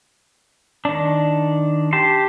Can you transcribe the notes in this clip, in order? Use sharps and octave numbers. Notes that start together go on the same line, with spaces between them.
D#3 D4
G4 A5 C6